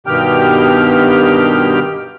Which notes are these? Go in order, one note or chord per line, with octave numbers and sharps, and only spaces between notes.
G2 B2 D#3 G4 G5 F6